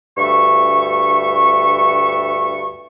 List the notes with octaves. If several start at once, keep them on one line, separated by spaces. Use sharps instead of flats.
D2 G2 E5 C#6